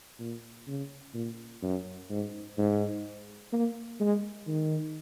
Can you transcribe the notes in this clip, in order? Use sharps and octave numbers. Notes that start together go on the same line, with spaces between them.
A#2
C#3
A#2
F#2
G#2
G#2
A#3
G#3
D#3